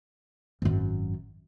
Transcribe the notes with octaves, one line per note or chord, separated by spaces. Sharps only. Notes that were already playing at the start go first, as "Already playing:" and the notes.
G#1 F#2